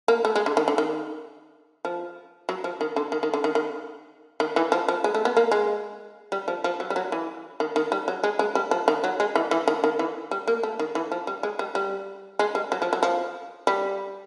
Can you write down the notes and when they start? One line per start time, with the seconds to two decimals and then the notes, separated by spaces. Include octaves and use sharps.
0.08 A#3
0.25 A3
0.36 G#3
0.46 D3
0.57 D#3
0.68 D3
0.78 D#3
1.85 F3
2.49 F#3
2.64 F3
2.81 D#3
2.96 D3
3.12 D#3
3.23 D#3
3.34 D3
3.44 D#3
3.55 D#3
4.40 D#3
4.56 E3
4.72 F3
4.88 F3
5.04 G#3
5.15 A3
5.25 B3
5.37 A#3
5.52 G#3
6.32 G3
6.48 F3
6.64 F3
6.80 F#3
6.90 G3
6.96 F#3
7.12 E3
7.60 D#3
7.76 D#3
7.92 G3
8.08 F#3
8.24 G#3
8.39 G#3
8.55 G3
8.71 F3
8.88 D#3
9.04 F#3
9.20 G#3
9.35 E3
9.51 E3
9.68 D#3
9.84 D#3
9.99 E3
10.31 G3
10.47 A#3
10.63 A3
10.79 D#3
10.95 E3
11.12 F3
11.27 G3
11.43 G#3
11.59 G3
11.75 G3
12.39 G#3
12.55 G3
12.72 F#3
12.82 F3
12.93 F#3
13.03 F3
13.67 G3